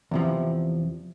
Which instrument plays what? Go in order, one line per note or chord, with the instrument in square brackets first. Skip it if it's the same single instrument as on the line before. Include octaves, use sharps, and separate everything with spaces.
[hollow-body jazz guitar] E2 C3 F3